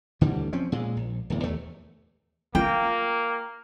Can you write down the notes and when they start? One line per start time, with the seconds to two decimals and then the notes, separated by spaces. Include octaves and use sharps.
0.21 D2 D3 E3 G3
0.53 F3 C4 C#4
0.72 A#2 G#3
0.97 A#1
1.30 D1 E2
1.43 D#2 A3
2.55 A#3 F4 G5